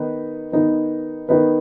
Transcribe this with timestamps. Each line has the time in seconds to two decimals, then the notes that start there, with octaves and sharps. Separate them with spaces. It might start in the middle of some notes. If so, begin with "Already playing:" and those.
Already playing: D#3 B3 D#4 B4
0.52 D#3 B3 D#4 B4
1.29 D#3 B3 D#4 B4